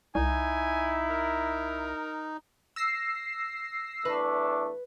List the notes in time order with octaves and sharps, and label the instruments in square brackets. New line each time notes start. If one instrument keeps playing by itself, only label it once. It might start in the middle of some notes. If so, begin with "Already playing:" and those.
[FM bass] C2 [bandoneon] D#4 [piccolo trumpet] E4 [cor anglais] G#5
[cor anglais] A#4
[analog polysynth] E6 A#6 C7
[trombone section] E2 A3 D4 [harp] B4